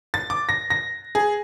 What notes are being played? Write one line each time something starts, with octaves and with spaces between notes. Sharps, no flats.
A6
D6
A#6
A#6
G#4